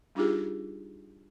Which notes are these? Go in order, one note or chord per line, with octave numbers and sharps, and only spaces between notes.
G3 D4 D#4 F4 G4 G#4